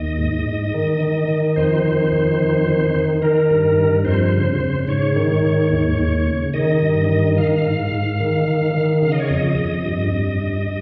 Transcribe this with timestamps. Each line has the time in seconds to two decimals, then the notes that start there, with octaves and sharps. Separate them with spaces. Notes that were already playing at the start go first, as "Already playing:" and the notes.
Already playing: D#2 D#5
0.18 G#2
0.46 G#2
0.74 D#3
1.01 D#3
1.28 D#3
1.56 F2 C5
1.85 D#3
2.12 F2
2.40 D#3
2.68 D#3
2.94 D#3
3.22 D#3 A#4
3.50 G2
3.78 G2
4.05 F2 C5
4.33 C#3
4.60 C#3
4.88 G#2 C#5
5.16 D#3
5.43 G#2
5.71 D#2
5.99 D#2
6.27 C#3
6.54 D#3 D#5
6.82 G2
7.09 D#3
7.36 D#3 F5
7.56 F5
7.65 G#2
7.92 G#2
8.20 D#3
8.48 D#3
8.75 D#3
9.02 C#3 F5
9.12 D#5
9.19 C#5
9.28 F2 D#5
9.59 F2
9.85 G2
10.13 G2
10.41 G2